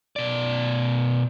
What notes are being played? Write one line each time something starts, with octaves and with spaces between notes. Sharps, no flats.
B2 D5